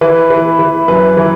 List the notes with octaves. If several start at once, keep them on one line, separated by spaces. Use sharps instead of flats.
E3 B4
E3
E3
F#2 B4
E3